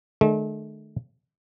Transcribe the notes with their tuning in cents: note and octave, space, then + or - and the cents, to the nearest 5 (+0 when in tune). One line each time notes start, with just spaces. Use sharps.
D#3 -45 A3 -40